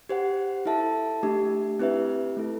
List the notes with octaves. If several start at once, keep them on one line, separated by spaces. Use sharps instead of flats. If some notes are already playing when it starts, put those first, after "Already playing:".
G4 C5 F#5
E4 A4 E5 A5
A3 D4 G4
C4 E4 G4 B4 E5
A3 E4 A4